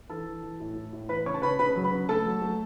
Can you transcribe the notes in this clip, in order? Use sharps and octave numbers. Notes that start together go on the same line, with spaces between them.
E3 A4 A5
E3
E3
A2
A2
A2
E3 B4 B5
C#3 C#5 C#6
A5
C#3 B4 B5
C#3 B4 B5
F#3
B4 B5
C#3
A3 A4 A5
F#3
A3